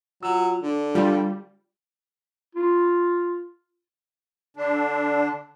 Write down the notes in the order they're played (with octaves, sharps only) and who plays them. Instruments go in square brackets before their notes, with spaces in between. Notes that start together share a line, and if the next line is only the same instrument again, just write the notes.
[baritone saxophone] F#3 [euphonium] F4 [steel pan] E6
[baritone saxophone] D3 [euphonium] D4
[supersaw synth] G3 [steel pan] F4
[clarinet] F4
[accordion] D3 D4